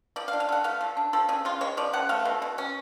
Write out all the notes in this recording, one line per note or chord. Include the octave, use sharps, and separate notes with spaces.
F3 D5
F5
D4
F5
D3 F#5
A3 F5
F3
D4
F3 A4
C#3 G#4
C#3 F4
G#3 C#5
F3 D5
C#3 F#5
A3 F5
B2
B2
C#4